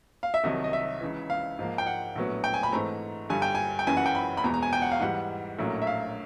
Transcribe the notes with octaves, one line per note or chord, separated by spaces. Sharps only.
F5
E5
C2 C3 D#3 F#3 D#5
D#5
E5
C#2 C#3 E3
F5
G#2 F3 A#3
G5
F#5
A#1 A2 F#3 B3
G5
G#5
B5
G#2 E3 A3 C4 A#5
G2 D3 G3 G#5
G5
G#5
G5
F#1 F#2 C#3 E3 G#5
F#5
G5
B5
B5
E2 B2 G#3 A#5
A#5
G#5
G5
F#5
F5
G#2 E3 G3 F#5
A#1 A2 F#3 A#3 C#4
E5
F5